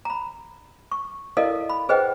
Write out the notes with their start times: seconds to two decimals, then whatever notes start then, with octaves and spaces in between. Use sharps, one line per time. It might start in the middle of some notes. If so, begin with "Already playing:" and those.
0.05 A#5 B5
0.92 C#6
1.37 E4 A4 A#4 D5 D#5 F5
1.70 B5
1.89 G#4 B4 C5 D#5 F#5 G5